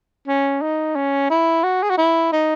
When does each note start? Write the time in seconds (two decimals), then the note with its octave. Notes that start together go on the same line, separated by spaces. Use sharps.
0.28 C#4
0.61 D#4
0.95 C#4
1.30 E4
1.63 F#4
1.82 G#4
1.90 F#4
1.98 E4
2.32 D#4